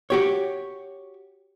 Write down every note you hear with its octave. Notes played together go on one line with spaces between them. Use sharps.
F#4 G4 C#5